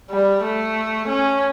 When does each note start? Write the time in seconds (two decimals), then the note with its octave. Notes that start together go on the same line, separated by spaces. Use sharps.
0.11 G3
0.44 A3
1.08 C#4